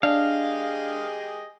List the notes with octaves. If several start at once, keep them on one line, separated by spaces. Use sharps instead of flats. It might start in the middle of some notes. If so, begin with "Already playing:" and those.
D4 G4 G#4 D#5 F5